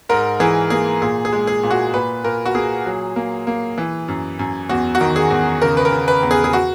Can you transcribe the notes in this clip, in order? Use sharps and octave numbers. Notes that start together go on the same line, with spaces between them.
G#2 A#4
E3 G#4
A#3 G#4
A#2 G#4
G#4
G#3
G#4
A#2
F#4
A#2 B4
A#2 A#4
F#4
A#3 G#4
F#3
A#3
A#3
E3
F#2
F#2
E2 F#4
F#4
D#3
G#4
E2
C#3 A#4
B4
A#4
C#3
B4
E2
G#4
G#4
F#4